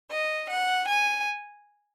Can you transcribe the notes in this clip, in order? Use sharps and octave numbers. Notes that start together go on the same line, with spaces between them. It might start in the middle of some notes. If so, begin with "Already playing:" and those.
D#5
F#5
G#5